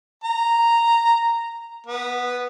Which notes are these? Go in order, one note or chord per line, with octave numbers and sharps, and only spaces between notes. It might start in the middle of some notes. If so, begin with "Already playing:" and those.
A#5
B3